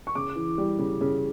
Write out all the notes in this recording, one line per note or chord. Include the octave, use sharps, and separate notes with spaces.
C#6
C#3 D6
E3
G3
C#3
C#3